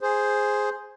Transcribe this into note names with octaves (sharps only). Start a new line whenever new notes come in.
G#4 C5